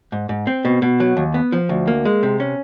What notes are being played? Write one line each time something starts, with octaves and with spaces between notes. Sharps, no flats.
G#2
G#2
C4
B2
B2
F#3
D#2
B3
F3
D2
A#3
G#3
C3
C#4